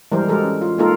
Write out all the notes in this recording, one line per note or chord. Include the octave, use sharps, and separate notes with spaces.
E3 G3 G#3 A#4 C5
G#3 F#4 G4 A4 A#4
C#4
F4
G#3 A#3 D#4 F4 A4 A#4